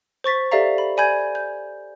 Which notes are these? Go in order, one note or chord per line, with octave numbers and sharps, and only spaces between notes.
C5 C#6 A6 B6
G4 A4 D5 E5 F5 A#5
B5
D5 G#5 B5 G6 G#6
G6